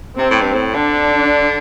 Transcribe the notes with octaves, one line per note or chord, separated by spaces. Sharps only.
C3 C4
A2
G2
A2
D3 D4